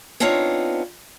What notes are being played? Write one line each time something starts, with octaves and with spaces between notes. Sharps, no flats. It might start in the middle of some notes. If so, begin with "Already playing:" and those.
B3 C4 D4 D#4 F4 C#5